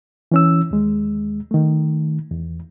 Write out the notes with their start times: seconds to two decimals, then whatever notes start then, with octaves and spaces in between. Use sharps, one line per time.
0.32 E3 C#4 E6
0.71 D#2 G#3
1.51 D#3 A3
2.31 E2